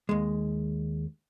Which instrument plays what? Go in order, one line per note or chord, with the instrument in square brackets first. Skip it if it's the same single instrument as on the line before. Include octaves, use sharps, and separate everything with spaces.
[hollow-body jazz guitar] D#2 G#3